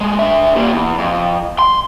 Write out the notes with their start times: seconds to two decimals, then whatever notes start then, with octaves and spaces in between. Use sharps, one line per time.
0.01 G#3 A3
0.19 D3 E5
0.55 A#2 G3
0.71 E2
0.98 F2
1.59 C6